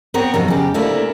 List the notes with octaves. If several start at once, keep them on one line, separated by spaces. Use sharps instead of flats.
B3 C4 A#4 C#5
F2 C3 D#3 F#3
C#3 G4
C3 A3 A#3 C#4 D4 E4